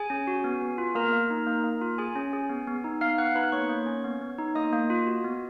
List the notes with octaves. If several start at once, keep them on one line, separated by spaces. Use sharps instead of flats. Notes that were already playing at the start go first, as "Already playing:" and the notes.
Already playing: G#4 G#5
C#4
F#4
B3
B3
F4
A#3 A#4 A#5
A#3
D#4
A#3
A#3
F4
G#4 G#5
C#4
G#4
B3
B3
D#4
B3 F5 F6
B3 F#5 F#6
D#4 B4 B5
A#3 C#5 C#6
A#3
C#4
B3
B3
D#4
A#3 D#5 D#6
A#3
F4
F#4
B3